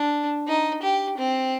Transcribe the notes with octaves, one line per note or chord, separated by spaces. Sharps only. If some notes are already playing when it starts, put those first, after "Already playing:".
Already playing: D4
D#4
G4
C4